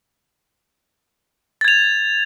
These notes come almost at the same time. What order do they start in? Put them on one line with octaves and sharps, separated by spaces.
A6 G#6 F7